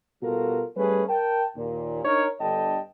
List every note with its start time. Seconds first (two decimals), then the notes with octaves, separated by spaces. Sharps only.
0.23 B2 G3 F4 F#4 A4 A#4
0.77 G3 A3 C#4 G#4 B4
1.09 A#4 G5 A5
1.57 D#2 A#2
2.05 D4 D#4 A#4 C#5
2.41 G1 D3 G3 D#5 G5 A5